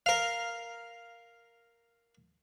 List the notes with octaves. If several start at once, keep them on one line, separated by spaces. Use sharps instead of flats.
A#4 F5